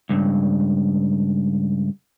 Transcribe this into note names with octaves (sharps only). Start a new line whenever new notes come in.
C#2 G2